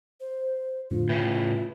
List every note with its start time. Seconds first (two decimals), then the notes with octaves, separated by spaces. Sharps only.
0.20 C5
0.91 F2 A2 D3 F4
1.09 A2 C#3 B4